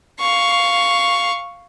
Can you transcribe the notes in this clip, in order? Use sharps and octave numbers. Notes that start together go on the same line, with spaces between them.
F5 C#6